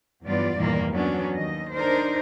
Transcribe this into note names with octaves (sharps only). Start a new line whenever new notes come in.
E2 G2 F#3 B3 F4 D5
E2 G2 A#2 D#3 A#3
F#3 B3 C#4 D4
D#2 D#5
D4 D#4 A#4 C5